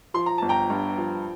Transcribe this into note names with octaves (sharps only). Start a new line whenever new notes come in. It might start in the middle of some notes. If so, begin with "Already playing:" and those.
F3 C6
A#5
G1 A5
G5 A#5
G2
F3